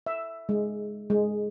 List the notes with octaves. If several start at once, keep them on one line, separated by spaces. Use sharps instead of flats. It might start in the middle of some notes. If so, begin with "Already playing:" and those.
E5
G#3
G#3